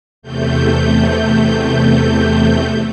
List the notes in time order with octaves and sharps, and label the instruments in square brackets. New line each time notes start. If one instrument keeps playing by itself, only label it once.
[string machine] E2 C3 A3 G6